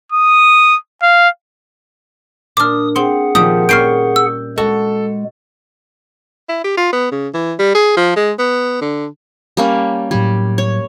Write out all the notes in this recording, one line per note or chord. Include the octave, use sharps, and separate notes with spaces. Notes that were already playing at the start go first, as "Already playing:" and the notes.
D#6
F5
A#2 D4 D6 D#6 F6
C4 G#4 F#5 C6
A#2 D#3 F3 G4 D#6
A#2 G3 C#4 C#6 F6 G6 C7 D7
E6
G#3 F#4 A4
E4
G4
F4
B3
C#3
E3
G3
G#4
F3
G#3
B3
D3
G3 A#3 C#4
A2 F#3 G3 G#6
C#5